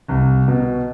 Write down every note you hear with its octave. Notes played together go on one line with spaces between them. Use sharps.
C2
B2